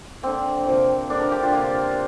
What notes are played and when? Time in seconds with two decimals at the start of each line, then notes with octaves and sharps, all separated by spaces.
0.23 D3 A#3 C4
0.66 C3 F3 A#3
1.10 D3 A#3 D4
1.21 A#4
1.32 G4
1.43 F4
1.53 C3 A#3 F4